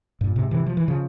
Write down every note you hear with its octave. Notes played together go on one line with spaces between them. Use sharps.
G2 A#2
G#2 C3
C3 E3
F3
E3
C#3 F3